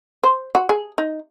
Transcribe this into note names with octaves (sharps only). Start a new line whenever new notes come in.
C5
F#4
G#4
D#4